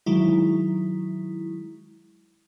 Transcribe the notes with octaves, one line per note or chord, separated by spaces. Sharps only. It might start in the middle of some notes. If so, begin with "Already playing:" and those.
D#3 F#3 G#3 E4